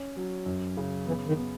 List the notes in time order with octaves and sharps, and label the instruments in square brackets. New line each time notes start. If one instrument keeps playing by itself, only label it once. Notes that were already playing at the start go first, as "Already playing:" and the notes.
Already playing: [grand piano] C#4
F#3
F#2
C#3
[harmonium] E3 [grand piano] B3
[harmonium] D#3
[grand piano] B3